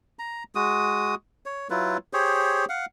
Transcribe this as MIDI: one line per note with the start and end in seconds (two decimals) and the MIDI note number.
0.19 0.44 82
0.55 1.15 56
0.55 1.15 66
0.55 1.15 87
1.46 1.68 73
1.70 1.97 54
1.70 1.97 64
1.70 1.97 65
1.70 1.97 71
2.13 2.65 67
2.13 2.65 68
2.13 2.65 72
2.13 2.65 73
2.69 2.86 77
2.69 2.86 78